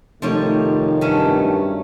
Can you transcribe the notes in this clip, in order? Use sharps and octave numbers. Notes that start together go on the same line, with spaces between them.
F1 D#3 F3 G3 A3 C#5
G2 F#3 A3 C#4